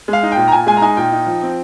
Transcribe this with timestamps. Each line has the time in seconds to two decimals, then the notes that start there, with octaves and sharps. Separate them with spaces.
0.08 G#3 F5
0.23 D#4
0.32 G5
0.37 A#2
0.48 A#5
0.52 A#2 G#5
0.67 G#3 G#5
0.77 A#5
0.82 D#4 G#5
0.97 A#2 G5
1.12 D#4
1.27 F3
1.42 C4